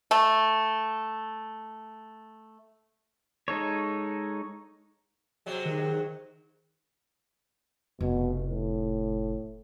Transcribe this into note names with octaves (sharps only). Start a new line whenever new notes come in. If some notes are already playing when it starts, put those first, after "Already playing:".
A3 A5
G#3 D#4 A4 C#5
C3 F#3 G#3
D#3
F1 B2
A2